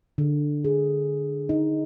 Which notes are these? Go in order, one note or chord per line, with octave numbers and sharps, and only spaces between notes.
D3
G#4
D#4